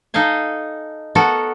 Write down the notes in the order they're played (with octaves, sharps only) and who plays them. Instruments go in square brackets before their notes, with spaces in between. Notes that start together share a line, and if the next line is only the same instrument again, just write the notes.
[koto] D#4 A4 D#5 F5 G#5
B3 F#4 A4 A#4